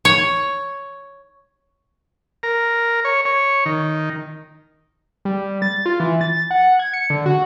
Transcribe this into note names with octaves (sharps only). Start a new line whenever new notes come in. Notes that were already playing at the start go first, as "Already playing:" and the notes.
C#5
A#4
C#5
C#5
D#3
G3
A6
F4
E3
A6
F#5
G#6
C#7
D3
F#4